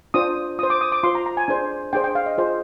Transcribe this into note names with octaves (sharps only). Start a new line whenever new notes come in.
D4 F4 C5 D#6
F4 C5 D#6
D6
D#6
D6
F4 C5 C6
A#5
A#5
G#5
D4 G#4 C5
D4 G#4 C5 G5
G5
F5
D#5
F4 G#4 C5